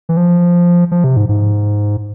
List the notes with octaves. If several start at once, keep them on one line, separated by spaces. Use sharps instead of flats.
E3
F3
F3
C3
G#2
G#2